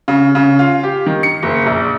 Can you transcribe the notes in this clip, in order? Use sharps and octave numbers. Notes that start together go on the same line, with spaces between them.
C#3
C#3
F4
G4
D#3
C#7
F#1
A#1